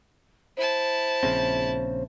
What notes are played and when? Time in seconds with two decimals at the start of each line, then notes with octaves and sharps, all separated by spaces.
0.57 E4 C5 A5
1.23 A#1 C#3 C4